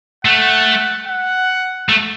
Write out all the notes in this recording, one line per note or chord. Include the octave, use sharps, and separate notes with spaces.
A3 F#5
F#5
A3